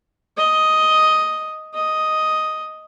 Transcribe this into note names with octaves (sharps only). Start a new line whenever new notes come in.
D#5
D#5